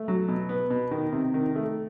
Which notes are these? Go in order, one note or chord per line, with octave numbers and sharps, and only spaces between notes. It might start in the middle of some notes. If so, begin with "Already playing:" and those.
Already playing: A3
F#3
B2
B3
B2
D#3
C3
D#3
A3